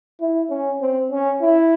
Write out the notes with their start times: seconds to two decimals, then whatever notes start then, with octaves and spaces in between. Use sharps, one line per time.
0.21 E4
0.50 C#4
0.81 C4
1.11 C#4
1.42 E4